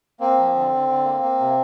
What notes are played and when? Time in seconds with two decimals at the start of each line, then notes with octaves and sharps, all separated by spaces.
0.20 A#3 C4
0.38 F3
0.55 D3
0.72 D3
0.88 D3
1.05 A#3
1.22 A#3
1.40 C3